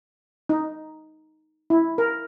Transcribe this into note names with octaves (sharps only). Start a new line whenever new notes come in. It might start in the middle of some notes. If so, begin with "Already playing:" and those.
D#4
E4
A#4